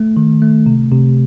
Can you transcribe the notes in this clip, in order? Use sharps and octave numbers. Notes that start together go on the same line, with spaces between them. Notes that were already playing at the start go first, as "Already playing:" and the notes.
Already playing: A3
D#3
A3
C3
C3